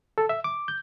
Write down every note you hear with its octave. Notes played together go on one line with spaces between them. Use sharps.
A4
E5
D6
G6